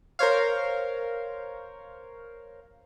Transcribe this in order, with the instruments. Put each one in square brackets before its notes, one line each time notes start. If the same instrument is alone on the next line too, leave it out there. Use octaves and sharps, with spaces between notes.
[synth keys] A#4 C5 C#5 F5